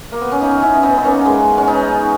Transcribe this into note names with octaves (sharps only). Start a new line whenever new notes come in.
A#3
B3
C#4
B3 D#4
C#4 E4
B3 D#4
B3
A#3 C#4
G#3 B3
C#4
B3 D#4